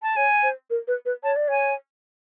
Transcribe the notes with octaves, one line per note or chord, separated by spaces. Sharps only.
A5
C#5 G#5
C5
A#4
B4
B4
C#5 A5
D5
C#5 G#5